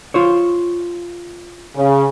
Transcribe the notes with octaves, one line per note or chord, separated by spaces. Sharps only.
F4 C5 C#5
C#3